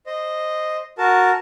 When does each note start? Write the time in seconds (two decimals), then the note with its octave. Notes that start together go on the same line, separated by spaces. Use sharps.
0.06 C5 D#5
0.98 F#4 A#4 A5